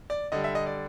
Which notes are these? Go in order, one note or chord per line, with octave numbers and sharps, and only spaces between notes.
D5
D3 G3 D#5
E5
D#5
D5